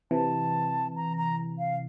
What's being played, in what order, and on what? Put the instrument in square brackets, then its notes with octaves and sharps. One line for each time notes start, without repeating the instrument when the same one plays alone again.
[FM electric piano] C3 E3 [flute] A5
[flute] A#5
A#5
F5